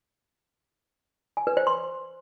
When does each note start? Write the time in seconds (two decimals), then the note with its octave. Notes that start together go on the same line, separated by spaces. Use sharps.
1.37 G#5
1.47 B4
1.57 C5
1.67 C6